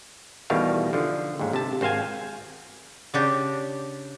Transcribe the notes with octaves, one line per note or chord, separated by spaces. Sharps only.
E2 B2 D#3 G3 A3 F5
D3 F3
D#2 G#2
C3 A5
G#1 C4 C5 F5 G#5
C#3 D4 G4